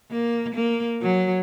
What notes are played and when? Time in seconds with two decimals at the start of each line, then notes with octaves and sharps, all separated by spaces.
0.11 A#3
0.55 A#3
1.02 F#3